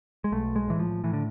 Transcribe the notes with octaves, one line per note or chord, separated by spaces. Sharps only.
G#3
B1 A3
G#3
A2 E3
F3
A2 E3
D3